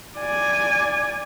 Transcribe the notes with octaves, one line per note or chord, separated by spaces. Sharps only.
D5 G#5